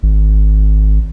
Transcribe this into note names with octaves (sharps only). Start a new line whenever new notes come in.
G#1